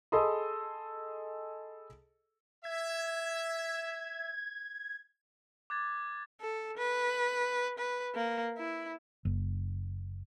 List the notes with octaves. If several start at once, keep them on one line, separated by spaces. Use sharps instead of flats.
G#4 A4 D#5 B5 C6 D#6
E5 G#6
D6 F#6 G#6 A6
A4
B4
B4
A#3
E4
F#1